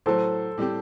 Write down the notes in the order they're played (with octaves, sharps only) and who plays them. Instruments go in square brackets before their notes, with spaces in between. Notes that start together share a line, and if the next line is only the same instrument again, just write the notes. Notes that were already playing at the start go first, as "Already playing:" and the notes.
[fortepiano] A2 F#3 A3 [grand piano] A4 C5
[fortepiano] A2 G3 C4 G4